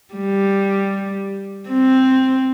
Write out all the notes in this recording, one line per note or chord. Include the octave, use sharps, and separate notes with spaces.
G3
C4